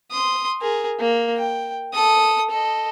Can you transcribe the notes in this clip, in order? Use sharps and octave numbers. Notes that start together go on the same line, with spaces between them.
C6 D#6
G#4 A#4
A#3
G5
A4 D#6
A4 D#5